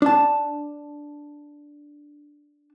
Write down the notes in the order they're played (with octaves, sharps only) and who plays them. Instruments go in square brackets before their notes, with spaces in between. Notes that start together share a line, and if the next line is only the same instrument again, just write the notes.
[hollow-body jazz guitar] D4 A5